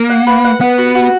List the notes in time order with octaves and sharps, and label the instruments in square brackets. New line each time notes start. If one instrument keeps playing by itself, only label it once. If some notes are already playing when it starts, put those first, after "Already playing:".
Already playing: [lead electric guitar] A#3
[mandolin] F#5
B4
F#5
[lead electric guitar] B3 [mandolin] F#5
[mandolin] F#4
F#4